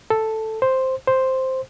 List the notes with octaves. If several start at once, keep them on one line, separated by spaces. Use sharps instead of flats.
A4
C5
C5